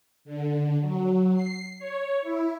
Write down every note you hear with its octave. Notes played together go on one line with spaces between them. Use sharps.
D3
F#3
C7
C#5
E4